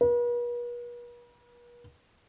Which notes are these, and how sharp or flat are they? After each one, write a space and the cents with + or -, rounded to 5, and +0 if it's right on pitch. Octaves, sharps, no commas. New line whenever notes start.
B4 -45